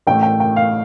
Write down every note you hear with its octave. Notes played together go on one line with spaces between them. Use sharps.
A1 A2 A3 G5
G5
G5
F5